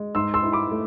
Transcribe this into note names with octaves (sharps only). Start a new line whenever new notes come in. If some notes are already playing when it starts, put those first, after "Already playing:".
Already playing: G#3
G#2 C6 E6
C6 E6
E4
B5 D6
A3